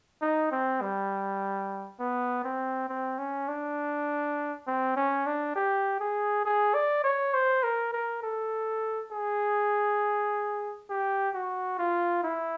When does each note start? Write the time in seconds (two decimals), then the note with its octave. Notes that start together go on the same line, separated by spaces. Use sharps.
0.22 D#4
0.52 C4
0.81 G3
2.00 B3
2.44 C4
2.89 C4
3.19 C#4
3.48 D4
4.67 C4
4.96 C#4
5.26 D4
5.55 G4
6.00 G#4
6.45 G#4
6.74 D5
7.04 C#5
7.34 C5
7.63 A#4
7.93 A#4
8.23 A4
9.12 G#4
10.90 G4
11.34 F#4
11.79 F4
12.23 E4